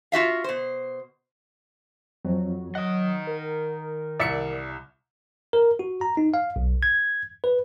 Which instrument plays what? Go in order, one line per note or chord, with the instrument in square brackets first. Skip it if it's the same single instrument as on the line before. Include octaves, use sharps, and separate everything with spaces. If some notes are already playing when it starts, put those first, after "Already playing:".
[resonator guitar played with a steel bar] F4 F#4 E5 F5
B2 C5
[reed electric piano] F2 [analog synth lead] F#3
[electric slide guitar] D#3 D#5 [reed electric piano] F#5 D#6
[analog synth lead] A#4
[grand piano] C2 C#7 [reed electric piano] D5 E5
[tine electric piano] A#4
F#4
A#5
D#4
F5
B1
G#6
B4